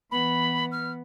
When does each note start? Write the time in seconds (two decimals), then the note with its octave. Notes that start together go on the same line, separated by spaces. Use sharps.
0.11 E3 B3 B5
0.72 F6